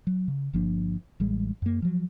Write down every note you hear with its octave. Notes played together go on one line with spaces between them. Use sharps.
F#3
C#3
G1 F3 A#3 D4
A1 G3 G#3
F#2 A#3
F3 F#3